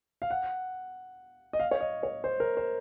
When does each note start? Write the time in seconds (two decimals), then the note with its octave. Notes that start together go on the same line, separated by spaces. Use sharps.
0.22 F5
0.30 F#5
1.53 D#5
1.59 F5
1.71 C#5
1.81 D#5
2.03 C#5
2.24 C5
2.40 A#4
2.57 C5